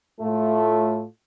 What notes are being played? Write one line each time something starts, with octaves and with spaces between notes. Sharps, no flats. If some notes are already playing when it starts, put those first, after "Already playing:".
A2 A3 F4